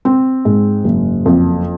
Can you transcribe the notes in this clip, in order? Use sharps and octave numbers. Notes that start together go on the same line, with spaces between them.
C4
G#2
F#1
F2